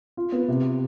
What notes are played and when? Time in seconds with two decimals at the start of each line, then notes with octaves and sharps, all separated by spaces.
0.17 F4
0.32 B3
0.48 C3